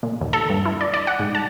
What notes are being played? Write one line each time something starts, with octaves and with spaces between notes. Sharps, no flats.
A#2
D#2
A4
G2
E4
D5
D5
F#5
G#2
A5